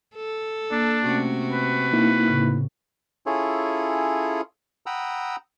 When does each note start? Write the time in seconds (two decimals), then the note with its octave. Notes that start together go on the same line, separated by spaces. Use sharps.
0.16 A4
0.71 A#3 D4
1.05 C3 A3 C#4 F#4
1.53 B4
1.93 A#3 D#4 E4
2.28 A2 C#3
3.26 C#4 E4 F4 G#4 A4 C#5
4.86 F#5 G5 A#5 B5 D#6 E6